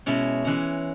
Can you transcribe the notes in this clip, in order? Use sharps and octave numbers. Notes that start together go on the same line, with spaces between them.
B2 G#3 C#4 E4
E3 G#3 C#4